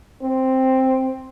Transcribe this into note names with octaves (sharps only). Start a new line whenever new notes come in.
C4